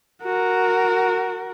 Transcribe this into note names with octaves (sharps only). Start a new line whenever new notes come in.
F#4 A#4